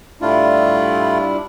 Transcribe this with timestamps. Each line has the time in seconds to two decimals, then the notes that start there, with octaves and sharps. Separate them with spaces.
0.21 A2 G3 A3 D4 E4 F4